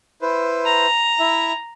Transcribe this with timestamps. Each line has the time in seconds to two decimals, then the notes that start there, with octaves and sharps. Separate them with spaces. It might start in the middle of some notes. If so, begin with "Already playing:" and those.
0.22 E4 B4 C5
0.65 A#5
1.20 E4 E5